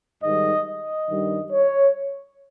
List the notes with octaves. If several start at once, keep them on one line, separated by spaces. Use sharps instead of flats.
G#2 D#3 G3 D#5
D#5
G2 D#3 G3
C#5